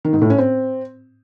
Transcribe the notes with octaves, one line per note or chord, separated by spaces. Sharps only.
D#3
G#2
A2
C#4
C4